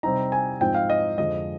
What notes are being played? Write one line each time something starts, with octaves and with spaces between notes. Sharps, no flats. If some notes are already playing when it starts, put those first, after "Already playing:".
C3 G3 C4 D#4 A#5
G#5
G#2 F3 C4 D#4 G5
F5
D#5
F2 D3 F3 G#3 D#5